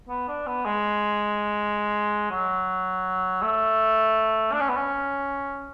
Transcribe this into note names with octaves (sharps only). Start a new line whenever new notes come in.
B3
D4
B3
G#3
F#3
A3
D4
C#4
B3
C#4